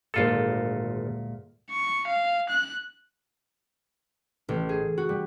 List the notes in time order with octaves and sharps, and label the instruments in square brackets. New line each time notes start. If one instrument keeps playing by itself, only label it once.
[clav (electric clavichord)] G#1 F4 A4 [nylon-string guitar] D2 A#2 G#3
[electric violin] C#6
F5
F#6
[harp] A1
G#4
F#4
G3